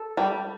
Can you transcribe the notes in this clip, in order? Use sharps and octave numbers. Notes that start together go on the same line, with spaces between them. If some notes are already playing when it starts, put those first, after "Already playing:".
Already playing: A4
G3